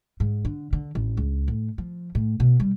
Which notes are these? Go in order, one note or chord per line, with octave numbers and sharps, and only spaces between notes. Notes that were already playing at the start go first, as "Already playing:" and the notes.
G#2
D3
D3
A1
C#2
A2
F3
A2
B2
G3